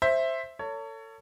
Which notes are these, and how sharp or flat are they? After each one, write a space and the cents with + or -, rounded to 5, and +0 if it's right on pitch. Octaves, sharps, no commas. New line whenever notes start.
C5 +10 E5 +0
A4 +35 C#5 +20